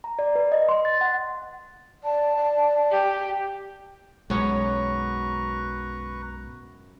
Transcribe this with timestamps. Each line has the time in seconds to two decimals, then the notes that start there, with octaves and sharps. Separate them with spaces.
0.04 A#5
0.19 D5
0.35 B4
0.52 D#5
0.69 C6
0.85 A6
1.01 F#5
2.04 D5 A5
2.36 D5
2.91 G4
4.30 B1 F#2 G#3 C#4 B4 A#5 C#6